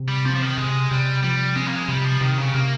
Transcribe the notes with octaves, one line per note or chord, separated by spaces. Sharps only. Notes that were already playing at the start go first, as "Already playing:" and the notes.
Already playing: C3
G3
F3 C4
F3
D#3
C3 G#3
C3 G3
F3 G3
G#3 C4
A#3
G#3
C3 G3
F3
C3 D#3
C#3
C3 A#3